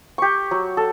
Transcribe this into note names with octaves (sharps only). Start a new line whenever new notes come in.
G4 C#6
F#3
A4